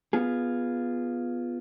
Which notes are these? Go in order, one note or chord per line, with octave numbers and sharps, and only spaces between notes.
B3 F4 G#4